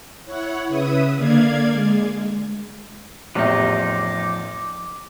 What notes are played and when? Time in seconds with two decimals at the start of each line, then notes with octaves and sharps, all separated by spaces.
0.24 E4 C#5 F#5
0.68 C#3 B4 E5 D#6
1.17 D3 A#3 D5 F5 G#6
1.71 G#3
3.35 A1 E2 C3 F3 D#4 D6